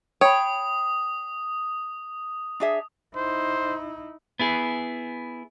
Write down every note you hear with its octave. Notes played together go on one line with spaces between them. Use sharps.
C#5 G5 B5 D#6
D4 G#4 E5
D#4 E4 C5
B3 E4 G#4